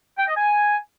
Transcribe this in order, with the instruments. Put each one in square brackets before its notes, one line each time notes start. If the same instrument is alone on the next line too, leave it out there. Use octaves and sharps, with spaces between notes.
[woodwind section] G5
D#5
G#5